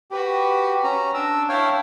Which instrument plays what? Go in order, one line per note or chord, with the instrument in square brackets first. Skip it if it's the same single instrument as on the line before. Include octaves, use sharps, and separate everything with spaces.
[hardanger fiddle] F#4 B4 [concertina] G4
[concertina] C#4 A#5
[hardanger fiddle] D4 [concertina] E6
[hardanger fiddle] E4 A5 [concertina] C#5 F5 G5